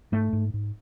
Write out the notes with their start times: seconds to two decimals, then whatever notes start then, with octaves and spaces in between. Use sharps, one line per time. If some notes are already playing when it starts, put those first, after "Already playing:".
0.12 G#2 A3
0.33 G#2
0.54 G#2